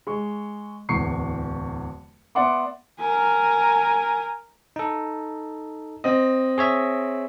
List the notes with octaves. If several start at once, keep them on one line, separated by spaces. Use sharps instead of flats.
G#3 C#6
D1 E2 C#6 C7 C#7
B3 D5 E5 F#5 C6 D6
A#4 G#5
D#4 A4
C4 D#5
G#4 C#5 E5